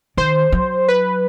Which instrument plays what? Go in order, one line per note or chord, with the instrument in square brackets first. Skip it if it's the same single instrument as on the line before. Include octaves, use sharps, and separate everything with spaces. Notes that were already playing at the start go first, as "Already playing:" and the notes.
[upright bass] D#3 [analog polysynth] C5
[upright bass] F#3
[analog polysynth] B4